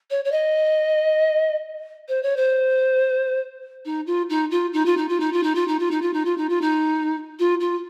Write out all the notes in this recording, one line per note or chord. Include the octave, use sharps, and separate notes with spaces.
C#5
C#5
D#5
C5
C#5
C5
D#4
F4
D#4
F4
D#4
F4
D#4
F4
D#4
F4
D#4
F4
D#4
F4
D#4
F4
D#4
F4
D#4
F4
D#4
F4
F4